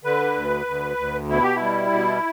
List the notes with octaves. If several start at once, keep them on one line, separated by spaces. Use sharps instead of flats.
D3 B4
D2
D2
D2
B2 E4
G4
E4
G3
B2